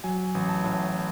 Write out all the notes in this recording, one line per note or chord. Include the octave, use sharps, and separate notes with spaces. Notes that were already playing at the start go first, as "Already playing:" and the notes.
F#3 G#5
A1
A5
A2